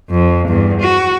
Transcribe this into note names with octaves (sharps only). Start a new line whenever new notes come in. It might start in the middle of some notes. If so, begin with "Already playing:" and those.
F2
E2 G2
F#4